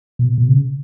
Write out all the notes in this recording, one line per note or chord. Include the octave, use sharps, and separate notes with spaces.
B2
B2
C#3